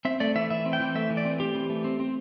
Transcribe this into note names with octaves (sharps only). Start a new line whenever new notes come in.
C4 E5
A3 D5
E3 E5
E3 E5
C4
G5
E3
A3 E5
E3
D5
C4
C4 G4
E3
A3
C4
C4